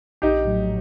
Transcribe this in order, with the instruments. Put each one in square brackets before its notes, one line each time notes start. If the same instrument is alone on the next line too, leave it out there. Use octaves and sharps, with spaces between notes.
[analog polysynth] A#1 [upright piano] D#4 G4
[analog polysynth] A2 F#3